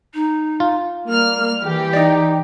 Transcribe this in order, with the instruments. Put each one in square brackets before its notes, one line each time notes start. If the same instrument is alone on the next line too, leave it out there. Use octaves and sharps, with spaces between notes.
[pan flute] D#4
[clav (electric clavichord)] F4
[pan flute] G3 [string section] A#3 F6
[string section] E3 G4
[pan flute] D#4 [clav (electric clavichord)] D5 D#5